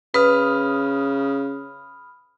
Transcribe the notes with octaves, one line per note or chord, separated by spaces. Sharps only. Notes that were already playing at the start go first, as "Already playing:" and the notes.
C#3 B4 B5 D#6 F6